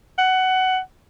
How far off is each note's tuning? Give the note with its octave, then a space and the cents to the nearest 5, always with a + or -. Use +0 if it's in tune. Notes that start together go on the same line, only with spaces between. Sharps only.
F#5 +15